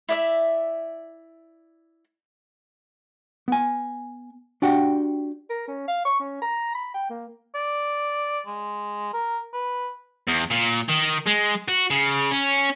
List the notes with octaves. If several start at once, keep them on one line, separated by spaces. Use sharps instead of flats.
E4 D5 E5
B3 G#5
D4 F#4 G4 F#5 G5
A#4
C#4
F5
C#6
C#4
A#5
B5
G5
A#3
D5
G#3
A#4
B4
E2
A#2
D#3
G#3
F#4
C#3
C#4